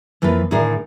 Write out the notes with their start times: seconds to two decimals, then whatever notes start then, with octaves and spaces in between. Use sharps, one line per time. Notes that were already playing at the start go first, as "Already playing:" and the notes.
0.22 F2 E3 A#3 F4 B4
0.51 D2 A2 D#3 G#4 A#4 D5